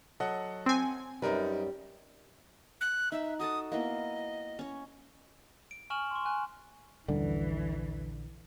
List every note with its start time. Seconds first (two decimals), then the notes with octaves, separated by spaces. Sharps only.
0.20 F#3 A4 D#5 F#5
0.66 C4 G#5
1.22 F#2 G3 D#4 A#4 B4
2.81 F#6
3.12 D#4 E5
3.39 F#4 A4 A5 D#6
3.72 A#3 B3 E4 D#5
4.59 C#4 C#5
5.71 D7
5.90 G#5 C#6 F6 E7 F#7
6.11 C6 C#6
6.25 G#5 F#6
7.08 A#1 D#2 D3 E3 G3 C#4